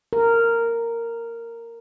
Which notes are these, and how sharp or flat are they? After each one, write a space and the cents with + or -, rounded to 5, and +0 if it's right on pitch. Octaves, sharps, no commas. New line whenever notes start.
A#4 -10